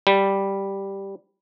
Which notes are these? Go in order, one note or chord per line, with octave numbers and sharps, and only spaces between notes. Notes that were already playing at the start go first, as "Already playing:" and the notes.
G3